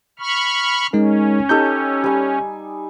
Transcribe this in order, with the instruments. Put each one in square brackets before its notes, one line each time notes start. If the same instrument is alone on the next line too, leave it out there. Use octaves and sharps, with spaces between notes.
[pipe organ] B5 C#6 F6
[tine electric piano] G#3 D#4 A#4 [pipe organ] C#4
[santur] D#4 G4 A4 [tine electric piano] G6
[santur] G3 G#5